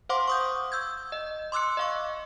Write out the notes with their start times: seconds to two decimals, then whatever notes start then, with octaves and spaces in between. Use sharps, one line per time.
0.09 C5 F5 F#5 C6 D6
0.27 C#6 D#6 G6
0.72 E6 G6 G#6
1.12 D#5
1.52 C6 D6 E6 F#6 C#7
1.77 D#5 F5 C#6